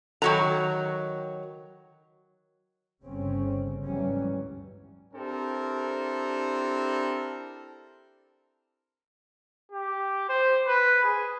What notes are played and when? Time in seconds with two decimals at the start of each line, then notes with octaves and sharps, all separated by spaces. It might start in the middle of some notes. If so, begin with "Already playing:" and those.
0.22 D#3 F#3 A4 A#5 C#6
3.03 G1 C#3 C4 C#4
3.85 D2 G#2 E3 F#3 G3 C#4
5.14 C4 D4 E4 G4 A4 A#4
9.72 G4
10.29 C5
10.67 B4
11.04 G#4